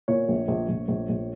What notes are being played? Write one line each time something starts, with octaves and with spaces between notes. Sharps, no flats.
A#2 C#5
A#1
A#1
A#1
A#1
A#1